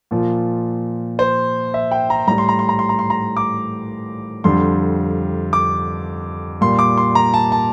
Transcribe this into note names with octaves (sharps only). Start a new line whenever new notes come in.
A#2 F3
C5
E5
G5
A#5
A2 G3 A#5
C6
A#5
C6
A#5
C6
A#5
C6
A#5
D6
F2 D3 G3 C6
D6
A#2 G3 C6
D6
C6
A#5
A5
A5